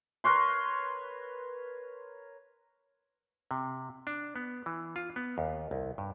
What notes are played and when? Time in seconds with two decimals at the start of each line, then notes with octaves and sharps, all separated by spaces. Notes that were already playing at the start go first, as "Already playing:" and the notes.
0.24 A#4 B4 C#5 C6
3.51 C3
4.07 D4
4.36 B3
4.66 E3
4.96 F4
5.16 B3
5.38 D#2
5.71 C2
5.98 G2